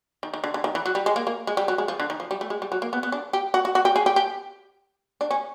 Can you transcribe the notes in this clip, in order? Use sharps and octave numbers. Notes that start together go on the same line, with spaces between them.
D#3
D#3
D3
D3
D#3
E3
F#3
G3
G#3
A#3
A#3
G#3
G3
F#3
G#3
F3
D3
D#3
F3
G3
A3
G#3
G3
F#3
A#3
B3
B3
D4
G4
F#4
F#4
F#4
G4
G#4
G4
G4
D4
C#4